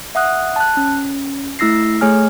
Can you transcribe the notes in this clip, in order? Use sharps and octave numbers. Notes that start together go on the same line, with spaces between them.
E5 F#5 D#6 F#6
A5 F#6
C#4
A3 E4 E6 A#6 C7
A3 G#4 C#5 G#5 F6